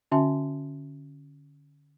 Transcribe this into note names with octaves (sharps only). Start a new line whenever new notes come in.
D3 C#4 F#4 E5 A5 C6